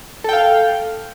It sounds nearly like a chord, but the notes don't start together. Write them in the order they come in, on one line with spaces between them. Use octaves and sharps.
A4 G5 F5